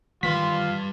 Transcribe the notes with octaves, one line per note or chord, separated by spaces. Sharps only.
D#3 E3 G3 F4 B4 B6